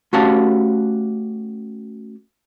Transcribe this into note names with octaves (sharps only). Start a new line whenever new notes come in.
A3 C#4 F#4 G4 F5 A5